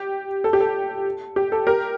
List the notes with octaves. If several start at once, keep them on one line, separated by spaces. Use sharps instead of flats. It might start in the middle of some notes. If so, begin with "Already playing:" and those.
Already playing: G4
A4
G4
A4
G4
A4
G4 A#4